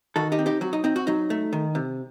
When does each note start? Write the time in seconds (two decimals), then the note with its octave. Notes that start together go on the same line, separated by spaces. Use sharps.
0.16 D#3 F#4 A4
0.32 D#4 G4
0.39 C4
0.46 D#4 G4
0.61 F#3 F#4
0.73 D#4
0.84 C4 D#4
0.96 F#4
1.07 F#3 D#4
1.30 A3
1.53 D#3
1.75 C3